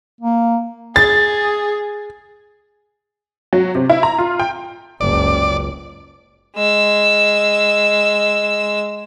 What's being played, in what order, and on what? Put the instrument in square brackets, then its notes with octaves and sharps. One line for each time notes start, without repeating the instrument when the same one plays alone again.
[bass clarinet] A#3
[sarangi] G#4 [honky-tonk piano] A6
[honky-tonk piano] F#3
C3
E4
A#5
F4
G5
[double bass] F#1 C#2 [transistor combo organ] D5
[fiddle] G#3 E6